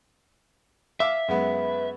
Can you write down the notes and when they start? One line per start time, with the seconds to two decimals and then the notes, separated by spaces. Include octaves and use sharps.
1.00 E5 F5 D6 E6
1.28 F#2 G#3 B3 B4